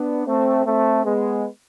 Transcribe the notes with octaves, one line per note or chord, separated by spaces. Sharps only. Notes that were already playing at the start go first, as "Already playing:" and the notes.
Already playing: B3 D4
A3 C4
A3 C4
G#3 B3